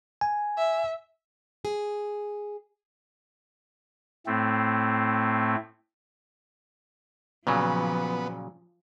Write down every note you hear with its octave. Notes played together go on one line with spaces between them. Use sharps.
G#5
E5
G#4
A2 A3 C4
A#2 C#3 F3 F#3 B3